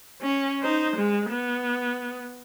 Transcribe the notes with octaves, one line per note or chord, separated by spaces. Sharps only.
C#4
D#4 C5
G#3
B3